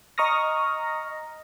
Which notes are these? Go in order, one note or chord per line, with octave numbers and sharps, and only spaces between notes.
D#5 A#5 C#6 D#6 F6 A#6